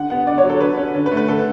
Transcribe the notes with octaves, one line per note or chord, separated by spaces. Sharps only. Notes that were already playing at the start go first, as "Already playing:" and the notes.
Already playing: D3 F#5
B3 F#5
D3 D5
C#5
F#3
A4
D3 B4
C#4
D3
B4
A3
B4
D3 A4